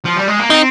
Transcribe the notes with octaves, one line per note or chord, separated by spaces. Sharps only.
F3
G3
G#3
A#3
C4 D#4